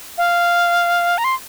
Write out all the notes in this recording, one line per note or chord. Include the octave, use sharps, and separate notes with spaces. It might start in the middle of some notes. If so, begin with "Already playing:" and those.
F5
A#5
C6